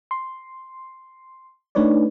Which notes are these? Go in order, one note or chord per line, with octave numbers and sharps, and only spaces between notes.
C6
A3 D4 D#4 B4 C#5 D5